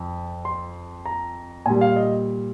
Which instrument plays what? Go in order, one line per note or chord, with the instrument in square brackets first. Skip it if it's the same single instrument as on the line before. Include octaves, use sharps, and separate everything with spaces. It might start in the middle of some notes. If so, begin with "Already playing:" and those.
Already playing: [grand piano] F2
C6
A#5
A#2 G3 G#5
F5
D#5